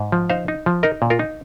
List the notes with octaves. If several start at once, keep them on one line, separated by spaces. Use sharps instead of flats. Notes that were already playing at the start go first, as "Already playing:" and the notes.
Already playing: G#2
F3
D#4 C5 F5
D#4
F3
D#4 A#4 D#5
A#2
F4 A#4
D#4